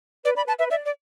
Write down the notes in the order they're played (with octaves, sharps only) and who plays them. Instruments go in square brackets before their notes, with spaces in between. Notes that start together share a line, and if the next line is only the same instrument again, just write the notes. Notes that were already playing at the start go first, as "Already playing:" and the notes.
[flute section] B4 [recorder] D5
[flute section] D5 [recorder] B5
[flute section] B4 [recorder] A5
[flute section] B4 [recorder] E5
[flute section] D5 [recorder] E5
[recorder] D5